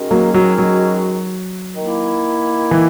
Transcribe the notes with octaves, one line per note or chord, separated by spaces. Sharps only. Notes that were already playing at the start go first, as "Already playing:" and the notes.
Already playing: D#3 G#3 C#4 F#4
F#3 A#3
F#3
F#3
D#3 A#3 E4
E3